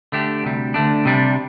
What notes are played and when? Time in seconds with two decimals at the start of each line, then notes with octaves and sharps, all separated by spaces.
0.12 D3 A3 D4 G4
0.44 D2 C3 G3
0.74 D2 D3 A3 D4
1.05 C3 G3 D4